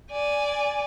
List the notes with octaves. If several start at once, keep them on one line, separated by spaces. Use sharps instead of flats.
D5 G#5